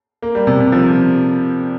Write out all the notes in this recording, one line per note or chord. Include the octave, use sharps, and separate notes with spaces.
A#3
G3
C3
C3
F3